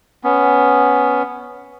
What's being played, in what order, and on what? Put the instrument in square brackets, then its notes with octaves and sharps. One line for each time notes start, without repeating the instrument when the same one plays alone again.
[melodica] B3 C#4